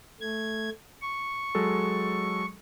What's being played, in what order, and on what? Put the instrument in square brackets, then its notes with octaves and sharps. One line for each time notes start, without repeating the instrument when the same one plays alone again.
[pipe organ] A3 G#6
C#6
[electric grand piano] F#3 G#3 A4